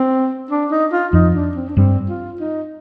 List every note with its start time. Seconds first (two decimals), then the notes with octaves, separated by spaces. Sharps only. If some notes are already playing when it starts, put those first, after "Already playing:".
Already playing: C4
0.51 D4
0.71 D#4
0.92 F4
1.13 F2 F3 D#4
1.35 D4
1.56 C4
1.69 D4
1.77 G2 G3 C4
2.09 F4
2.40 D#4